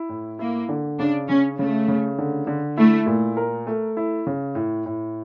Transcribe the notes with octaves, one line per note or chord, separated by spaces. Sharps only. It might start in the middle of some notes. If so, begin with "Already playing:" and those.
Already playing: E4
A2
A#3 E4
D3
C#3 D4
C#3 C#4
C#3 A3
C#3
D3
D3
A3 E4
A#2
A#4
A3
E4
C#3
A2
A2